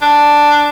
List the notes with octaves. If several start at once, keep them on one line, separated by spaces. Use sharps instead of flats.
D4